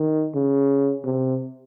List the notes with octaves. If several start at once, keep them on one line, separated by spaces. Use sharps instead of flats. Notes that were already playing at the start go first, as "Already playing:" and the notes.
Already playing: D#3
C#3
C3